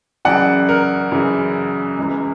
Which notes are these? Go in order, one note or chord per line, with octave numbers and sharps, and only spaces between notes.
F#2 C#3 E3 D5 F#5
A#4
F#2 C#3 E3
C#2 C#3 E3